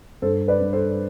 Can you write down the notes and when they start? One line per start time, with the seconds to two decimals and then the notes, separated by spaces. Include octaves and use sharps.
0.22 G2 A4 C5
0.48 B4 D5
0.61 G2
0.73 A4 C5